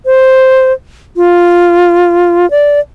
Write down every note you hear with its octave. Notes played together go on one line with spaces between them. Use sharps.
C5
F4
D5